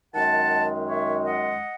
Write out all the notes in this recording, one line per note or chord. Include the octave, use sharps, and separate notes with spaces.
F#2 D#3 G#3 F#5 A5
C#5 E5
D#5 F#5